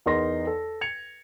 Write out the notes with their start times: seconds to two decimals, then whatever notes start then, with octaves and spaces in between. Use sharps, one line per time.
0.06 E2 D#4 A#4 C6 A#6
0.47 A4
0.81 G#6 C#7 F7